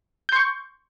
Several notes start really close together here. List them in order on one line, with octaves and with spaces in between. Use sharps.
G6 C6 C#6